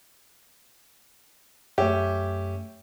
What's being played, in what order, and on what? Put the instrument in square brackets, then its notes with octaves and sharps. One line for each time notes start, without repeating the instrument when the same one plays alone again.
[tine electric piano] F#2 A3 [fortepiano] C#4 G4 E5